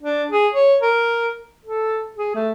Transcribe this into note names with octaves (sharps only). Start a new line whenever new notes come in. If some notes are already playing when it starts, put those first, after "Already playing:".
D4
G#4
C#5
A#4
A4
G#4
A3